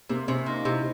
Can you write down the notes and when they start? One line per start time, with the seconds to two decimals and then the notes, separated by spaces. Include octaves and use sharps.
0.10 C3 A#3
0.28 C3 C#4
0.46 A#3 D#4
0.62 D#4
0.65 C3 E4